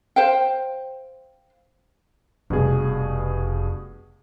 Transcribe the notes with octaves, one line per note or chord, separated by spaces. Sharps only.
C5 F5 G5
F1 G2 B2 G#4